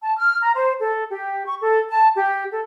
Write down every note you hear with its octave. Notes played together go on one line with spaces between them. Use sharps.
A5
F6
A#5
C5
A4
G4
C#6
A4
A5
G4
A4